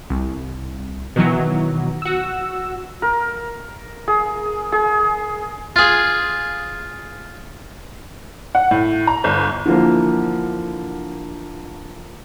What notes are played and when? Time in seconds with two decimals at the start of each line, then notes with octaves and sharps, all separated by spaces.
0.10 C2
1.16 B2 D#3 E3 F#3
2.02 F#4 E6
3.02 A#4
4.08 G#4
4.72 G#4
5.76 F4 G#4
8.55 F#5
8.71 A2
9.07 A#5
9.24 G1
9.66 D3 E3 F3 A#3